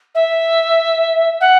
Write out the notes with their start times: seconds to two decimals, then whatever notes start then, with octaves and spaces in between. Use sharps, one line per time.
0.15 E5
1.40 F#5